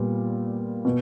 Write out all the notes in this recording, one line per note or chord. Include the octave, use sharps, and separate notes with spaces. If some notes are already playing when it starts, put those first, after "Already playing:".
Already playing: A#2 G3 B3
B2